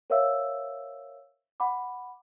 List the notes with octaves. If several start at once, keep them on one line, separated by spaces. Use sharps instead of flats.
A#4 C5 C#5 E5 F5 E6
F#5 B5 D6